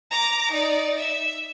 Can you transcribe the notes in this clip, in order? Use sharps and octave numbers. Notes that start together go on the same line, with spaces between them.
A#5 D6
D#4 D5
E5